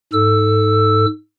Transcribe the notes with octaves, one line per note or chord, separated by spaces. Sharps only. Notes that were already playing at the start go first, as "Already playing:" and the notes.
G#2 A4 E6